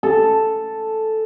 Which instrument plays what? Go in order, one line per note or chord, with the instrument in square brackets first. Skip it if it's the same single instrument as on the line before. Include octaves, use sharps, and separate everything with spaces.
[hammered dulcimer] A4